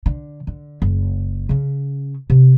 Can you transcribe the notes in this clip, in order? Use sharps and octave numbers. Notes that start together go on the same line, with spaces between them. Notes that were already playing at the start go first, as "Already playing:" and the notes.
D3
D3
F#1
C#3 C#4
C3